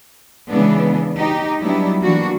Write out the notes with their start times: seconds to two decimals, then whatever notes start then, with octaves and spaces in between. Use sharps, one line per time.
0.49 C#3 E3 G#3 B3 D4
1.17 D#4 G4
1.62 F#3 G3 B3 D4 E4
2.01 E3 A#3 D4 F#4